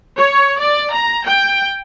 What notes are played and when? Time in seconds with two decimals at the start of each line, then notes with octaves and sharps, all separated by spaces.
0.17 C#5
0.60 D5
0.93 A#5
1.26 G5